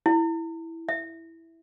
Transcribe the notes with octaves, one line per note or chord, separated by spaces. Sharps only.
E4
E5